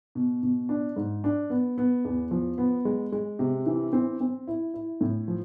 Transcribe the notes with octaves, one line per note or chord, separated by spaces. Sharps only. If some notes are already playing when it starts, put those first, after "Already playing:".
B2
B2
D4
G#2
D4
B3
B3
E2
F3
B3
G#3
G#3
C3
E3
C4
C4
E4
E4
A2
F3